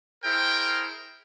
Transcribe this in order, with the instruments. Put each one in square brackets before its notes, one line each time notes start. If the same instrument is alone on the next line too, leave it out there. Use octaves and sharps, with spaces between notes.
[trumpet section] E4 G#4 A#4 C5 G5